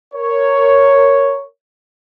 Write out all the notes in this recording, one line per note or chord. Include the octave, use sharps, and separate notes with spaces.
A#4 C#5